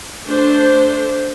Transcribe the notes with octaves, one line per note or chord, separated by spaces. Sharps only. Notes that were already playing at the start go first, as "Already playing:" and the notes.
A3 D4 C5